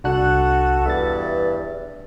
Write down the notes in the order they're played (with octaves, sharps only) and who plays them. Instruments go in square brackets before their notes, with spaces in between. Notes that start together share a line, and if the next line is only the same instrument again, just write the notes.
[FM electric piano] C2 D4 F#6 [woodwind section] F#4 A4
[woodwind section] E2 G2 [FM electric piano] E5 A6